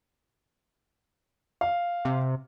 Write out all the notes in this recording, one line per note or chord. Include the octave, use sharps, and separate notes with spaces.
F5
C3